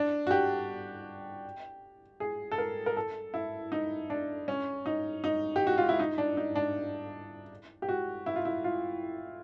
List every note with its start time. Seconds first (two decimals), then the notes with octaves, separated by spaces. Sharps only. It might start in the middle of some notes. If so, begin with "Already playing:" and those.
Already playing: D4
0.27 F#4
0.31 G4
2.20 G#4
2.51 A4
2.58 A#4
2.86 A#4
2.97 A4
3.34 E4
3.72 D#4
4.10 D4
4.48 C#4
4.86 D#4
5.24 D#4
5.56 G4
5.67 F#4
5.78 F4
5.89 E4
5.99 D#4
6.18 D4
6.37 D#4
6.55 D4
7.82 G4
7.89 F#4
8.26 E4
8.36 F4
8.45 E4
8.64 F4